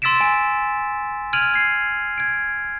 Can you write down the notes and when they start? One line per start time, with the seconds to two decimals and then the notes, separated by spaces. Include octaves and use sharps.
0.02 C6 E6 A6 B6 D7 E7
0.21 G#5 D7
1.33 F6 G#6 D7 D#7 F7 F#7
1.54 G#6 C7
2.18 G#6 D7